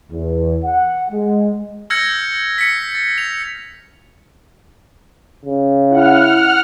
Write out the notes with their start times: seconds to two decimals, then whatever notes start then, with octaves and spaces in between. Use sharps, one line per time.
0.10 E2
0.64 F#5
1.11 G#3
1.90 E6 F6 G6 G#6 A#6 C#7
2.58 B6 C#7
2.95 A6
3.18 F7
5.46 C#3
5.91 E4 F#5 F6